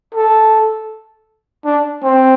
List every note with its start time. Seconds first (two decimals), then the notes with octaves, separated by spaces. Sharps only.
0.14 A4
1.65 D4
2.03 C4